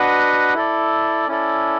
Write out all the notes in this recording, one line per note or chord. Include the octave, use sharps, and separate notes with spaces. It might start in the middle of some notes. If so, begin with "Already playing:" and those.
Already playing: D4 F#4 B4 D#5 F#5
E4 A4 D5
C#4 E4 A4 D5